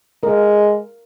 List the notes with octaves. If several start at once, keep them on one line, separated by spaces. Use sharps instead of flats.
G#3 A#4